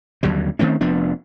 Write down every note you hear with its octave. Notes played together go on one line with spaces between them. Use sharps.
D#2 D3 F#3 G3
D#3 A3 C4 C#4
F1 F3 B3 D4